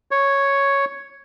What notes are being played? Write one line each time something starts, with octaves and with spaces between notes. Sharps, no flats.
C#5